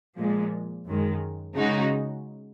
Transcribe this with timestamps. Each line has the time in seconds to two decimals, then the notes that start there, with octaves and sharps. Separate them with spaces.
0.18 A#2 F3 G#3
0.87 F#2 D#3 G#3
1.56 C#3 G#3 D#4 F#4